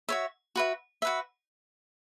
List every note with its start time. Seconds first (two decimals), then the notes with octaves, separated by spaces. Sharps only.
0.09 F#4 C#5 E5
0.56 F#4 B4 E5
1.02 F#4 B4 E5